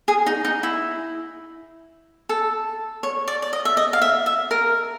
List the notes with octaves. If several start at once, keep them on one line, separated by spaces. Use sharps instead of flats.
G#4
D#4
D#4
E4
A4
C#5
D5
D5
D#5
E5
D#5
F5
E5
E5
A#4